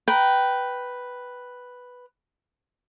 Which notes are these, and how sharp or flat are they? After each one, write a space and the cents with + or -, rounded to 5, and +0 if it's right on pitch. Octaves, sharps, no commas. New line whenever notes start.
B4 +0 G5 -10 A#5 +0